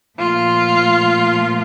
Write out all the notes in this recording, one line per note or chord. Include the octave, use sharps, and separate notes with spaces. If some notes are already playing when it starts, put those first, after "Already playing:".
A#2 F3 A3 F4